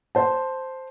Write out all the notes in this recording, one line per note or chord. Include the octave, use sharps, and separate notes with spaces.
C5 A5